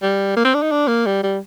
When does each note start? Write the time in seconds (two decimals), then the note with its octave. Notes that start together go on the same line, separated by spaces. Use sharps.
0.02 G3
0.36 A#3
0.45 C4
0.54 D4
0.62 D#4
0.71 D4
0.87 A#3
1.06 G3
1.23 G3